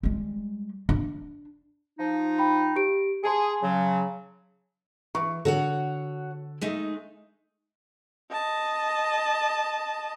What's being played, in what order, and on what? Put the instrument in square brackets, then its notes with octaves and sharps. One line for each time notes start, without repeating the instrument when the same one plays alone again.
[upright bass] G3 G#3
D4
[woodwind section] F3 D#4
[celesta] G5 B5
G4 D7
[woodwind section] G#4 [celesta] G#5 A5 C6
[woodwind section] C#3 F#3
[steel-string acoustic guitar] E3 [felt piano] C#6
[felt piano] D3 A4 [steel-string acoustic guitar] F#4 C#5 F#5
[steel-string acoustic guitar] G#3 A3 D#4
[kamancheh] D#5 A5